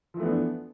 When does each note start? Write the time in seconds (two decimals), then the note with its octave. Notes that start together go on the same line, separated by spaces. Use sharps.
0.14 F3
0.17 E3
0.20 A3
0.23 B3
0.26 D4